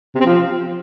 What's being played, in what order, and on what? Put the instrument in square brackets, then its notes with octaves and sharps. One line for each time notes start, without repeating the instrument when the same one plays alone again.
[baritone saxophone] C3
C4
F3